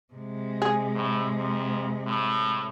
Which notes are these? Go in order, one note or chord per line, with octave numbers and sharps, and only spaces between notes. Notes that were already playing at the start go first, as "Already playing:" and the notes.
C3 G#3
G#4
A2
F2
A2